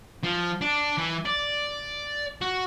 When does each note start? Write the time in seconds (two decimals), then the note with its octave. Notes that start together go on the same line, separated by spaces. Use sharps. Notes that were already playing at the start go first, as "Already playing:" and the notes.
0.23 F3
0.61 D4
0.98 E3
1.25 D5
2.41 F#4